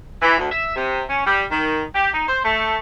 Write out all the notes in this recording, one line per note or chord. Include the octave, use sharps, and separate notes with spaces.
E3
D2
E5
C3
C#4
G3
D#3
G4
D#4
C5
A3